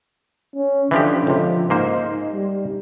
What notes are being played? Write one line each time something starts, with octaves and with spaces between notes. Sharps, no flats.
C#4
D3 E3 F3 G4
C#2 C3 F3
G#2 A#3 D#4 C5
G3